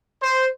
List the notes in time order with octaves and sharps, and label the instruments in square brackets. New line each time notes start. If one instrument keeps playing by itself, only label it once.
[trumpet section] C5